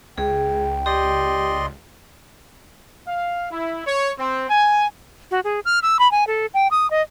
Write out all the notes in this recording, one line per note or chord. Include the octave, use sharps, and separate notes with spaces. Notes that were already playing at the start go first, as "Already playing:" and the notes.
C#2 G#4 G5
G4 D5 D#5 C6
F5
E4
C#5
C4
G#5
F#4
G#4
F6
E6
B5
G#5
A4
G5
D#6
D#5